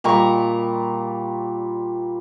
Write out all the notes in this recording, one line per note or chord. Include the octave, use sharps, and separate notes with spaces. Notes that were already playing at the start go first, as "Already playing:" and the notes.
A#2 G3 A#5 C#6